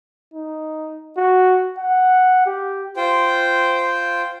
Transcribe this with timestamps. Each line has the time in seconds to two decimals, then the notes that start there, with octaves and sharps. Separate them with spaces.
0.34 D#4
1.17 F#4
1.79 F#5
2.46 G4
2.97 F4 C5 G5